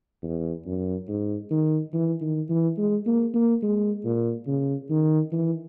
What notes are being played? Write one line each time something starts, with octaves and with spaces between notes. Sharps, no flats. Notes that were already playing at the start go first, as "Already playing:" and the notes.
E2
F#2
G#2
D#3
E3
D#3
E3
G#3
A#3
A#3
G#3
A#2
C#3
D#3
E3